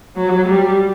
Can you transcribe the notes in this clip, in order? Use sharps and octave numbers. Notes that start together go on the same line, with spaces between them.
F#3
G3